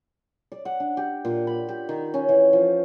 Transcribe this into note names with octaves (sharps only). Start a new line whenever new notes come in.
D5
F#5
D4
G4
A#2
B5
G4
D#3
C#4
E3
F3